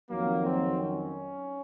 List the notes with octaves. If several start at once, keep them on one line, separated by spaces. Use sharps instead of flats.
F2 D#3 F#3 A#3
C4
C#4